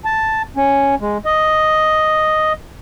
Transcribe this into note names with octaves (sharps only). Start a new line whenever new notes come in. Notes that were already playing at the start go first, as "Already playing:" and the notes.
A5
C#4
G#3
D#5